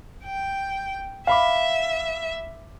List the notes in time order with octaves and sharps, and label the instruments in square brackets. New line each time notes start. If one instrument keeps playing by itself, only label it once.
[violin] G5
[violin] E5 [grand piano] F5 B5 D6